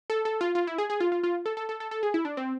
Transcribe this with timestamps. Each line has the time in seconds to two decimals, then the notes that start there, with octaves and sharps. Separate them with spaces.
0.10 A4
0.25 A4
0.41 F4
0.55 F4
0.67 E4
0.78 G#4
0.90 G#4
1.00 F4
1.12 F4
1.23 F4
1.46 A4
1.57 A4
1.69 A4
1.80 A4
1.91 A4
2.03 G#4
2.14 E4
2.25 D4
2.37 C4